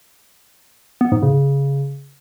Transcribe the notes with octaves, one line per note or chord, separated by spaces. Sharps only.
B3
G#2
C#3